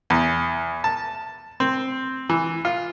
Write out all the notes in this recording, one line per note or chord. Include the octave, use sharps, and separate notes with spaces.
E2
A5
C4
E3
F4